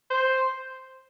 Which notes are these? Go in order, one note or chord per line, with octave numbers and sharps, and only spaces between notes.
C5